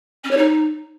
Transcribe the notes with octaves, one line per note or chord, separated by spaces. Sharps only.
C#4
C#5
D#4